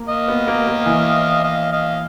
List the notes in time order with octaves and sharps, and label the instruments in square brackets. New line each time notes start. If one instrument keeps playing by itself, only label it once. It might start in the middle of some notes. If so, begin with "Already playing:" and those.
Already playing: [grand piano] A#3
[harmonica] D#5 F5
[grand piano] B3
A#3
A#3
E3
[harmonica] D#5 F5
D#5 F5